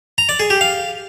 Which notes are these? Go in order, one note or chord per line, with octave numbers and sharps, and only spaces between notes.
A#5
D5
G#4
G4
F5